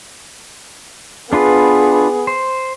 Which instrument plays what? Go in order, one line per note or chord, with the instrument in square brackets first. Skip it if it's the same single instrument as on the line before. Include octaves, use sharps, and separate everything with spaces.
[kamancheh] B3 G#4 [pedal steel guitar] D4 F4 B4
[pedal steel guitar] C5